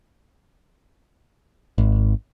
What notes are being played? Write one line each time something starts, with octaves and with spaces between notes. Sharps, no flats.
G#1